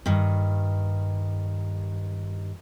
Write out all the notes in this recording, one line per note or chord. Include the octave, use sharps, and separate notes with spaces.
G2 D#3